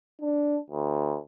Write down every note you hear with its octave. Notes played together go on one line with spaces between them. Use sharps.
D4
D2